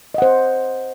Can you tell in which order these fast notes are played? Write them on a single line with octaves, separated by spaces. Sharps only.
D#5 F#5 C5